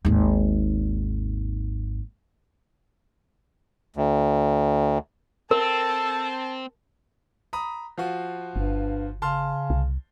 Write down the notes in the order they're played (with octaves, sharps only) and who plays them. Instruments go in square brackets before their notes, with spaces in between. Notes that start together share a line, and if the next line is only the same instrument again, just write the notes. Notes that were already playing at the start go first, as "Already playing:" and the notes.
[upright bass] G#1 D#2
[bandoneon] D2
[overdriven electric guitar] C4 [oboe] A4 [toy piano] A#4 [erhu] A5
[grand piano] A#5 B5 D#6
F3 F4 F#4
[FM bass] G1 [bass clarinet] G2
[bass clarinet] C#3 [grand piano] A5 C6 F6
[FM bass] C2